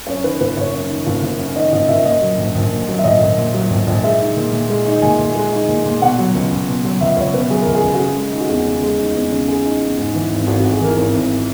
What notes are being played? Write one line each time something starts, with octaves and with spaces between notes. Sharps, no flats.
F#2 C#5
D#3 B4
F#1 B4
F#1 C#5
F#2
D#3
F#1
F#1
F#2
D#3 D#5
F#1 D#5
F#1 E5
A#2 D#5
F#3
A#1
A#1
A#2
F#3
E5
A#1 D#5
A#1
A#2
F#3
A#1
A#1
G#3 E5
D#4
A#2
A#2
G#3
D#4
A#2 G#5
A#2
G#3
D#4
A#2
A#2
B2 F#5
F#3
C#2
C#2
B2
F#3
C#2 E5
C#2 C#5
B2 B4
F#3 G#4
C#2 A#4
G#4
C#2
F#4
C#3 G#4
G#3
D#4
F#4
E2 G#4
C#3
G#3
D#4
E2
C#3
G#3 G#4
D#4
E2
G#2
E3
G#1
G#1 F#4
F#4
G#2
G#4
E3 A#4
G#1 A#4
G#1